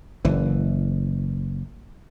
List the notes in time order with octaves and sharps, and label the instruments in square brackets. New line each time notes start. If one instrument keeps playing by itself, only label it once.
[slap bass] F#1 E3